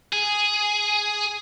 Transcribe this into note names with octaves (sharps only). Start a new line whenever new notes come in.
G#4